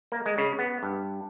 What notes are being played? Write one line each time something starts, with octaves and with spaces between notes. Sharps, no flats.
A#3
G#3
C#3
B3
G2